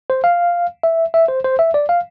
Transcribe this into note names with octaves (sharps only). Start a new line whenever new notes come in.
C5
F5
E5
E5
C5
C5
E5
D5
F5